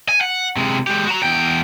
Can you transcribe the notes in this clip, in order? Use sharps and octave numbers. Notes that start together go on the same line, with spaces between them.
G#5
F#5
C3 G#3
G#3 G4
F#4 A#5
E2 G5